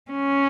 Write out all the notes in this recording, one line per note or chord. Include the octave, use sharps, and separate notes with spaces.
C#4